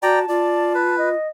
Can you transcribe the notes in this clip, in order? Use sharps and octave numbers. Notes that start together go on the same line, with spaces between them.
F#4 D5 G5 A5 A#5
F4 D5
B4
D#5